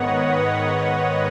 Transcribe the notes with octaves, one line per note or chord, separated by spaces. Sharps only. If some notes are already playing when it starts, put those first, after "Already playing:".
Already playing: G#2 D#3 B3 B4 C#5 D#5 F#5
C#5